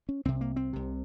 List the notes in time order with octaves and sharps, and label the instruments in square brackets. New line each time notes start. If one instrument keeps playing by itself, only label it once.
[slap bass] C#4
C2 C3 C4
A#3
C4
C2 C3